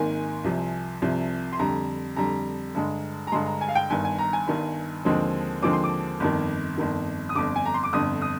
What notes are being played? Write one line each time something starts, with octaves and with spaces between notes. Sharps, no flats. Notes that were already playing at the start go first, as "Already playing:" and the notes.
Already playing: G#1 G#2 D#3 A#3 G#5
C2 C3 F3
C2 C3 F3
C6
F2 D3 G3 A#5
F2 D3 G3 A#5
G2 D3 G#3
A#5
G2 D3 G#3 C6
A#5
G#5
F5
G5
G1 G2 D#3 G#5
G#5
A#5
G#5
G1 G2 D#3
D#2 D3 F3 G#3 C4
D#2 D3 F3 G#3 C4 D6
C6
D6
G1 F2 D#3
G1 F2 D#3
D#6
G1 F2 D3 D6
G#5
A#5
C6
D6
G1 F2 D3 D#6
D#6